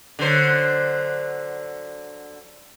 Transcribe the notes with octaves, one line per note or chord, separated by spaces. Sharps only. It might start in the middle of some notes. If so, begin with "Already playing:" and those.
D3 F#3 C5